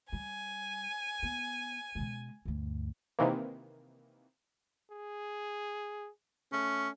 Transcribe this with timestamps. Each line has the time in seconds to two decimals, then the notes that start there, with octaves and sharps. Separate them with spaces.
0.13 G3 G#5
1.23 B3
1.95 B2 G#3
2.45 D2 G2
3.19 C3 D#3 E3 A#3
4.91 G#4
6.53 A3 C#4